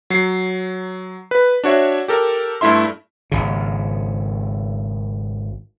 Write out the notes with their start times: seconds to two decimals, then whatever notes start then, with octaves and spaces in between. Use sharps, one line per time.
0.10 F#3 C7
1.31 B4
1.64 D4 F#4 C#5 E5
2.08 G4 A4 A#4
2.61 G2 A3 E4 E5 C6
3.32 G#1 C#3